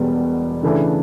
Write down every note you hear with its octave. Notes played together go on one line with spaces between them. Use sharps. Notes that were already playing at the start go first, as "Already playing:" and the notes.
Already playing: E1 E2 B2 G3 B3
C#3 E3 A3 D4